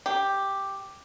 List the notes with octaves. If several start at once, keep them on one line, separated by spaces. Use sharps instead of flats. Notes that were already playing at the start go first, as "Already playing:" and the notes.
G4